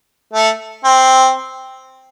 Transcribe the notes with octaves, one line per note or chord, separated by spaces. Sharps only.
A3
C4